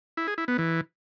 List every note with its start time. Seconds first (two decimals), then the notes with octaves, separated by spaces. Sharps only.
0.17 E4
0.28 G#4
0.38 E4
0.48 B3
0.58 E3